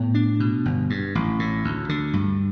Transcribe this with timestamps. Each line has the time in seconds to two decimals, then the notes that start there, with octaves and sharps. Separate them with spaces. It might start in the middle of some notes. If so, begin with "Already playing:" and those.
Already playing: A2 B3
0.14 D4
0.40 B2
0.65 G1
0.90 G2
1.15 A1
1.39 A2
1.64 D2
1.89 D3
2.13 G2